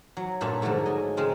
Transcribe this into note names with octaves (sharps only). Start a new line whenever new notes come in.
F#3
G2 A#2 A4 E5 A5
G#2 D3 F3 F#3 A3
D#5 G#5
C#3 G#3 C4 A#4